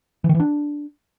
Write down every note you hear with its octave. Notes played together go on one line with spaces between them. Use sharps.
E3
D#3
E3
D4